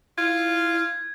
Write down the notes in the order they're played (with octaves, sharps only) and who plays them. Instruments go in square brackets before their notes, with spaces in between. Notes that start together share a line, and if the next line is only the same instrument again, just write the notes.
[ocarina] E4 [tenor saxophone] F4 [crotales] G#6